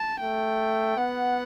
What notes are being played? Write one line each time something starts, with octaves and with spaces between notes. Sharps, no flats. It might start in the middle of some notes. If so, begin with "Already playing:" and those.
Already playing: A5
A3 G5
B3 F#5